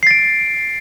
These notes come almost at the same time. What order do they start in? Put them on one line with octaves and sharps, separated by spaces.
C7 A6 D7